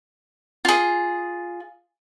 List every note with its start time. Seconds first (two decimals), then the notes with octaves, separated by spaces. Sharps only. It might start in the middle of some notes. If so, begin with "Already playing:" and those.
0.65 F4 G#4